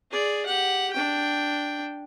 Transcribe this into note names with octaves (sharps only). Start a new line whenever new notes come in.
G#4 D5
G4 F#5
D4 G5